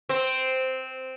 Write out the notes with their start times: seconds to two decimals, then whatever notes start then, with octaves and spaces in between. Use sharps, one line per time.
0.09 C4